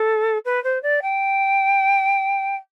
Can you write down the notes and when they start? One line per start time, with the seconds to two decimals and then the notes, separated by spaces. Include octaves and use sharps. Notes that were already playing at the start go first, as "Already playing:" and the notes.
Already playing: A4
0.45 B4
0.64 C5
0.83 D5
1.02 G5